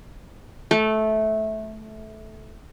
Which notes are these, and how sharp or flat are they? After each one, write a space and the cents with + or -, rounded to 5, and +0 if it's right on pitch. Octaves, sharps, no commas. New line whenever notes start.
A3 -15